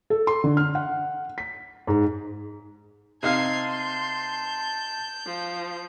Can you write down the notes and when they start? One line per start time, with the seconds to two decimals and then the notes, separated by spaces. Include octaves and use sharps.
0.10 A4
0.27 C6
0.44 D3
0.57 F6
0.75 F#5
1.38 B6
1.87 G#2
3.23 C3 D#4 F5 A5 C6 G#6 C7
3.75 G6
5.26 F3